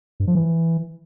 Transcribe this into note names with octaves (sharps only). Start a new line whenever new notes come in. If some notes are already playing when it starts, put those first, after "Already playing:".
G2
F3
E3